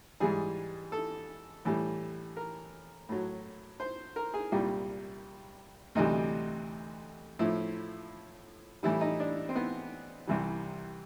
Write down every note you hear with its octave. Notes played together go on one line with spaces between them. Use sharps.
G#2 E3 G3 G#4
A4
A2 E3 G3
A#4
A2 F#3
C5
A#4
G#4
C2 A#2 G3 G4
D2 C3 E3 G3 D#4
A2 F3 E4
A2 E3 G3 E4
D#4
D4
C4
B3
C2 C3 E3 G3